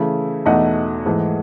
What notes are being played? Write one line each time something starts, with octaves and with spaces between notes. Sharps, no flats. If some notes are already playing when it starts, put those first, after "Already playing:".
Already playing: C#3 E3 A3 E4
E2 B2 A3 D#4 D#5 F#5
G#2 E3 A3